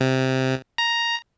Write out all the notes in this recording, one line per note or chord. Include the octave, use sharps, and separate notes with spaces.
C3
A#5